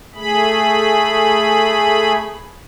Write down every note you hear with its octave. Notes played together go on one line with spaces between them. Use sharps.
A3 G#4 B5